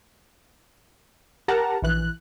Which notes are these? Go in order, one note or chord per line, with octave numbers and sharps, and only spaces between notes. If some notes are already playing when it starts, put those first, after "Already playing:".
G4 A#4 F#5 A5 A#5
A#1 E3 F#6